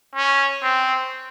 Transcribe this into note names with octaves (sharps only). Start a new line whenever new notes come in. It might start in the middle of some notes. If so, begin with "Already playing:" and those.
C#4
C4